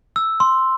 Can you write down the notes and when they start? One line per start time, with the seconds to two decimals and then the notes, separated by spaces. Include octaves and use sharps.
0.16 E6
0.40 C6